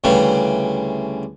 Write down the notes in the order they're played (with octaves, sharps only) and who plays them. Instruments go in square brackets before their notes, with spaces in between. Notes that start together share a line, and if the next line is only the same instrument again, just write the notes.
[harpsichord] D2 C#3 E3 G3